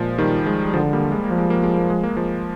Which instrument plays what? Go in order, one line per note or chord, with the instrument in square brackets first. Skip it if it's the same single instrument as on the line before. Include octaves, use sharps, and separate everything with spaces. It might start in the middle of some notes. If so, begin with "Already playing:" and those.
Already playing: [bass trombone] A#2 [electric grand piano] F3 G#3
[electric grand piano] D#3 G3
F3 G#3
G3
[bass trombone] D3 [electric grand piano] F3 G#3
[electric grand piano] G3 A#3
G#3
A#3
[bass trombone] F3
[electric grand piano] G#3
A#3
G#3
A#3
G#3
A#3
F3 G#3